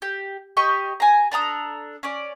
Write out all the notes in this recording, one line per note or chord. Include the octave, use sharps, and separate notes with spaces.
G4
G4 D#5 C#6
G#5 A#5
D4 A4 A#5 D#6
C#4 D5